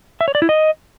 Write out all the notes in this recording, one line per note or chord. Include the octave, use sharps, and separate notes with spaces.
E5
C#5
D5
E4
D#5